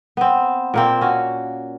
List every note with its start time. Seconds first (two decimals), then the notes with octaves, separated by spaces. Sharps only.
0.17 B3 C4
0.74 A#2 A#3 C4
1.01 C#4 F#4